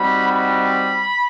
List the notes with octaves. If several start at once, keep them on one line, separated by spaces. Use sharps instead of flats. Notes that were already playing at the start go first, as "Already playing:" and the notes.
Already playing: G3 C4 D#4 F#4 B5
B5